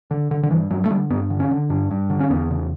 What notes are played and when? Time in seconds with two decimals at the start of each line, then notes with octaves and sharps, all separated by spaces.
0.11 D3
0.31 D3
0.43 D3
0.51 G2 E3
0.71 G2 F#3
0.86 A3
0.90 D3 G3
1.10 G2 B3
1.30 D3
1.40 C#4
1.51 D3
1.70 G2 D4
1.91 G2
2.10 D3
2.20 C#4
2.30 E2 B3
2.51 C#3